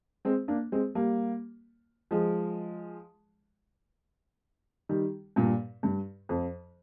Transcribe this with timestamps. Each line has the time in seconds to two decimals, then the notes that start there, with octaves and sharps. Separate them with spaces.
0.25 G#3 C4
0.48 A#3 D4
0.72 G#3 C4
0.95 G3 A#3
2.11 F3 G#3
4.89 D#3 G3
5.36 G2 A#2
5.83 G2
6.29 F2